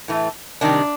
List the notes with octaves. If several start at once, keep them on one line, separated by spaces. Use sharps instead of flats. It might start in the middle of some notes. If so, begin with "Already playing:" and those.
A2 E3 A3
C3 D#3 G3 D4